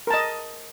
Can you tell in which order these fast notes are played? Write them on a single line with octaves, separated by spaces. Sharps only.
A#4 A5 D#5